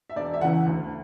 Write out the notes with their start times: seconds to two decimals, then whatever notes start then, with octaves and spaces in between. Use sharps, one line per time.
0.10 E5
0.16 E1 D5
0.33 E5
0.41 E2 C#3 E3 F#5
0.66 D2